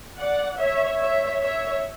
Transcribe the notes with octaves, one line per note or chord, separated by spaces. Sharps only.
D5 F#5
C#5 E5
C#5 E5
C#5 E5